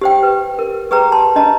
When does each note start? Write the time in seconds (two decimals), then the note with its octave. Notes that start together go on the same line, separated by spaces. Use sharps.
0.01 G4 C5 G5
0.23 B4
0.59 A#4
0.91 G4 G#4 B4 G5 A#5
1.12 A5 C6
1.36 D4 D#5 A5 A#5